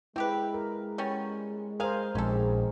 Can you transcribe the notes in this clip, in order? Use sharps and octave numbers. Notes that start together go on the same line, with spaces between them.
G#3 C4 E4 G4 B4
A#4
G3 B3 C#4
G#4 A#4 C5 F5
A#1 G#3 C4 C#4 D#4 G#4 A4